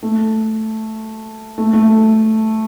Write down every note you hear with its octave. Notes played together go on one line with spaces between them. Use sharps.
A3
A3
A3